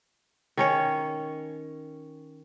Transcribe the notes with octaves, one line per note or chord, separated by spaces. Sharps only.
D#3 C#4 C#5